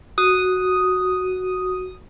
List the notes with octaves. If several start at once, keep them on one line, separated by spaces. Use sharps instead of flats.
F#4 D#6